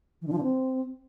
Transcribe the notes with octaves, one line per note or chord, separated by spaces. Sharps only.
E3
D3
F3
D3
C4